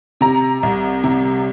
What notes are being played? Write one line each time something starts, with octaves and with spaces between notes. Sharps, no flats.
C3 A#5
C2
C3